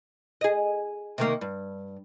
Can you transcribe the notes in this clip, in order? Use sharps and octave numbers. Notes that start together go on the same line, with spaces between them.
G#4 D#5
C3 D#3 A#3
G2